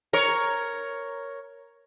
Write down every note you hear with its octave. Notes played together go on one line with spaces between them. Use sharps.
A#4 C#5